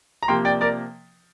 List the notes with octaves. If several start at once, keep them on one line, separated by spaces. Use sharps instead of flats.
A#5
C3 F3 A#3 G5 C6
D5 G5
A#4 D5